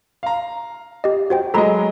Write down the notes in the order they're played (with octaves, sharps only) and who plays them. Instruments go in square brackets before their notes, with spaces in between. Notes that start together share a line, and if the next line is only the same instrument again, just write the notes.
[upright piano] F5 A#5
[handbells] G4 D#5
F#4 C5 G5
[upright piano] F#3 G#3 D#5 [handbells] A4 A#5 B5